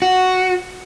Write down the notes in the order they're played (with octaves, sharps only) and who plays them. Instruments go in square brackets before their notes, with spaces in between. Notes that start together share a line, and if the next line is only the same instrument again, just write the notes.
[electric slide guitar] F#4